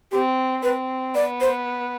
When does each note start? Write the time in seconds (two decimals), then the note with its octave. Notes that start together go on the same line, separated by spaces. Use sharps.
0.12 C4 G4
0.63 C4 B4
1.14 B3 D5
1.41 C5